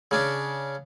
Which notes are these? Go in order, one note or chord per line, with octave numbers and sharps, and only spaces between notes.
C#3 C#4 D4